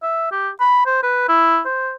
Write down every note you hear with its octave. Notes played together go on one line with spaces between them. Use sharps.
E5
G4
B5
C5
B4
E4
C5